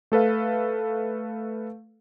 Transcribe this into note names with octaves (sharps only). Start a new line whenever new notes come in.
A3 A4 B4 F5